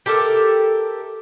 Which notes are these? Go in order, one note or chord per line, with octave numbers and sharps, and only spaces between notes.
G4 A4 A#4 E5